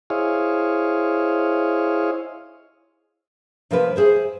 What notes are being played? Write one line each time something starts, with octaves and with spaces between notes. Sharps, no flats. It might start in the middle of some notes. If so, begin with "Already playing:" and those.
E4 G#4 C5 C#5 D#5 F5
C3 F3 A#3 A#4 B4
G#4 C5 E5